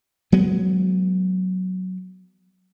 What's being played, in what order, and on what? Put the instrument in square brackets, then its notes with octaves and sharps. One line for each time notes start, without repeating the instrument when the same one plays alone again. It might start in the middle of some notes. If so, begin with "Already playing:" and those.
[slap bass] F#3 G#3 B3